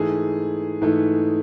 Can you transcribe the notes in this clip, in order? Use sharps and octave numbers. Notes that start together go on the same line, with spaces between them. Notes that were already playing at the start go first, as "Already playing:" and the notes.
Already playing: G#2 E3 A3 G#4
G#2 E3 A3